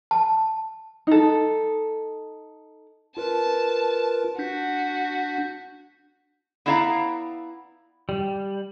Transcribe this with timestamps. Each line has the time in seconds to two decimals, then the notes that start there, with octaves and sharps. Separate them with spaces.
0.11 A5
1.07 D#4 A4
3.17 F4 A#4 B4 A5
4.39 D4 F#4 G6 B6
6.66 B3 D4 E4 D5 F5 A#5
8.09 G3